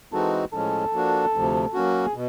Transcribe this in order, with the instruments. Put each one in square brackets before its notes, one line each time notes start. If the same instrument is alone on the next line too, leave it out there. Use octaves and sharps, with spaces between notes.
[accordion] E3 G#3 C4 D#4 F#4 [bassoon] A4
[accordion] A2 F3 G#3 C#4 [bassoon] A4
[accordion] F3 A#3 D4 F#4
D2 C3 F3
F#3 A#3 C#4 F#4
[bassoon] G#4
[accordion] B2